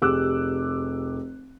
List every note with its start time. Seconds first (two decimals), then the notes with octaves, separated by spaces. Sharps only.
0.02 F1 G4 G#4 D6 E6 F#6